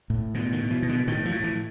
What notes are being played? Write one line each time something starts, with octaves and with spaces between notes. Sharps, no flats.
A2
B2 D3
D#3
B2
E3
B2
D3
A2 D#3
F3
A2
E3